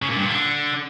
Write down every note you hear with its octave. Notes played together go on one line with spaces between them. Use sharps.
C#3
A#2
G2
A#2
D3